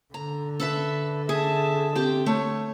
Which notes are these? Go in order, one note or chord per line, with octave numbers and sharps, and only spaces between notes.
D3 A#5
A4 B4 E5
G#4 E5 A5
C4 G4 G5
A3 C#5